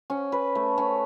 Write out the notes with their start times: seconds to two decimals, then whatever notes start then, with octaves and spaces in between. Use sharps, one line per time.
0.10 C#4
0.32 B4
0.55 A3
0.78 C#4